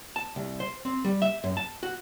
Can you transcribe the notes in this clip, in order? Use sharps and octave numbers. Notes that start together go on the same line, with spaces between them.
A5
C2
C5
C4
G3
E5
F#2
A5
F#4